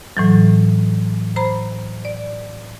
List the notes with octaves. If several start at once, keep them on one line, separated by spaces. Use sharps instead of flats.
A2 E3 F#3
C5 A#5 B5
D5